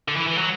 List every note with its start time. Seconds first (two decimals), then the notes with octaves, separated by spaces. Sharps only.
0.08 D3
0.16 E3
0.27 E3
0.38 F#3